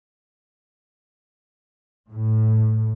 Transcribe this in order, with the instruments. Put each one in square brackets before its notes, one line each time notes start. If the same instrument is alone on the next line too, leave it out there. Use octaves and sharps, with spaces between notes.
[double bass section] A2